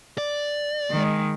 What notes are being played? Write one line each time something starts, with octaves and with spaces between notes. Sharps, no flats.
D5
D#3 G#3